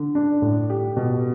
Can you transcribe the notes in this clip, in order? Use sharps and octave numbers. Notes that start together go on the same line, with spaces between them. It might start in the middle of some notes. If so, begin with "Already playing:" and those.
Already playing: D3
D4
A2
G4
B2